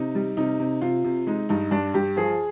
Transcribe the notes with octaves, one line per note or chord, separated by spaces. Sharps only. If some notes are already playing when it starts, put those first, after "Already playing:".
Already playing: C3 D#4
G3
C3 D#4
C3
C3 F4
C3
G#3 D#4
G2 D#4
G2 D4
G2 G4
F3 G#4